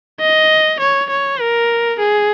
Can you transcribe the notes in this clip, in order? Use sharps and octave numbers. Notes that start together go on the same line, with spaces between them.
D#5
C#5
C#5
A#4
G#4